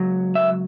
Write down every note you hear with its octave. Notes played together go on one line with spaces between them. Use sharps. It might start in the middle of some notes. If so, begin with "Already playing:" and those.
Already playing: C#2 F#3
E5